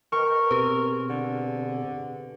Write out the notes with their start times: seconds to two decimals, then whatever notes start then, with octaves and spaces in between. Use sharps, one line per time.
0.12 A#4 B4 D#5 G5 C#6
0.51 B2 C4 G4 G#4 B4
1.10 D3